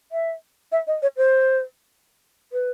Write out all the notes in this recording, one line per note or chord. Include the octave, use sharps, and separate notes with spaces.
E5
E5
D#5
C#5
C5
B4